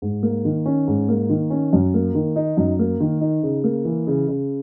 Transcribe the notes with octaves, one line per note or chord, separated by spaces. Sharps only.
G#2
A#3
D#3
C#4
G#2
A#3
D#3
C#4
F#2
A#3
D#3
D#4
F#2
A#3
D#3
D#4
C#3
A#3
E3
C#3
C#3